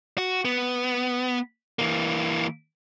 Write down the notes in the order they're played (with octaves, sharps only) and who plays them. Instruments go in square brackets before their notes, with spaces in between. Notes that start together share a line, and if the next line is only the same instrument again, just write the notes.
[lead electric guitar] F#4
B3
E3 A#3